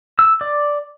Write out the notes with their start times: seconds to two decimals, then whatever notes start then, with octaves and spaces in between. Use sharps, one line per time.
0.19 E6
0.41 D5